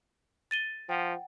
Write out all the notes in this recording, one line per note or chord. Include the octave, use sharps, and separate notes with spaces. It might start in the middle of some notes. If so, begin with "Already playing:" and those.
A6 D#7 G7
F3 F#5 G5